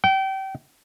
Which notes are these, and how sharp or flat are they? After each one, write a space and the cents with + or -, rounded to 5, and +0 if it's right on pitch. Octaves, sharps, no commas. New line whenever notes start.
G5 -30